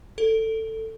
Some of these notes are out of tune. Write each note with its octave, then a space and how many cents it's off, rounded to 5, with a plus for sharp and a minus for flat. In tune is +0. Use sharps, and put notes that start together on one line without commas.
A4 +15